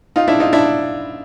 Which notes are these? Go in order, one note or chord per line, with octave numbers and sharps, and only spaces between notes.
D#4 F4
D4 E4
D#4 F4
D4 E4